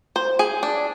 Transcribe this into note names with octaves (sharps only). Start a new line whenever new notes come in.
C5
G#4
D4